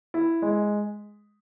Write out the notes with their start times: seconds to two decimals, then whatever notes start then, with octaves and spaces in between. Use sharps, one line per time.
0.14 E4
0.42 G#3